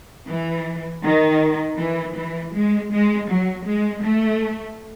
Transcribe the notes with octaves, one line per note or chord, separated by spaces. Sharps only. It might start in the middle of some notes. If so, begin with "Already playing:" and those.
E3
D#3
E3
E3
G#3
G#3
F#3
G#3
A3